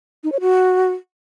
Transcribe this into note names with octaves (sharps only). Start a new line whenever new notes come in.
D#4
C#5
F#4